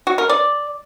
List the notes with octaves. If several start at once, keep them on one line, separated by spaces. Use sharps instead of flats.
F#4
A#4
D5